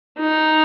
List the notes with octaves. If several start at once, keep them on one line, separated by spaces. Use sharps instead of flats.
D#4